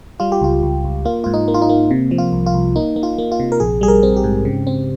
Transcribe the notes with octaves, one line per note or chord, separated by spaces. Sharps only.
G3 F4
G4
C#2 F4
C#2
C#2
A#3 F4
G#2 F4
D#4
A#3
F4
D#4
A#3
C3
F3
F4
C2
F4
C2
A#3 D#4
A#3
F4
A#3
F4
C3
A#4
A#1 G#4
G3 G#4
A#4
C4
G4
G#2
C#3
C4